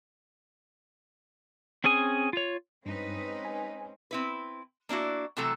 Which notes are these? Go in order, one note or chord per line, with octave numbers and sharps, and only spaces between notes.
C4 C#4 G#4 G#5 D#6
F4 C#5
G2 G#3 C4 C#4 D#4 B4 D#5
G#5
C4 E4 B4
A#3 D4 E4 F#4
C3 E3 F#3 A3 A4 A#5